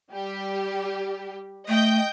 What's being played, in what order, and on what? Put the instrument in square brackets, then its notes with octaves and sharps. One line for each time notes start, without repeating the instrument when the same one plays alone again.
[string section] G3 G4
[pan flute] A3 [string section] D#5 G5 G6